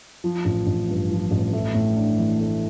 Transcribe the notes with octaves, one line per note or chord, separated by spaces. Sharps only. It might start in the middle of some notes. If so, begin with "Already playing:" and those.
F3
A1
A1
G2
F3
A1
A3
A2
D4
E3
A3